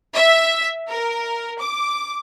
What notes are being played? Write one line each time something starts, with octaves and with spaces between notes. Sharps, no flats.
E5
A#4
D6